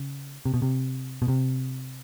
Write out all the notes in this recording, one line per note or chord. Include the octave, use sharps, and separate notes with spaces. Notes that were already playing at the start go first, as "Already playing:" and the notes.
Already playing: C#3
C3
B2
C3
B2
C3